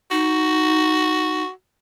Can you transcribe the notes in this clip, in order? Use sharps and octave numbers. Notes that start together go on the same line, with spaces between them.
D#4 F#4